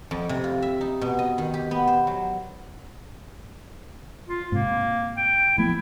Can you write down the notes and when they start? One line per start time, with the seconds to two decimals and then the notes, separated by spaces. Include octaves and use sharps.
0.11 F2
0.29 C3
0.44 F4
0.62 E5
0.81 D#4
1.01 B2
1.19 D#5
1.38 D#3
1.54 G4
1.71 B3
1.87 C5
2.07 F#3
4.27 F4
4.52 G#2 C3 A#3
5.17 G5
5.58 F3 A3 B3 E4